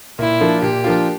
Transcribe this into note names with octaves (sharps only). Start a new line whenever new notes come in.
A#2 E4
F3 A#3 D4 F4
A#2 G4
F3 A#3 D4 F4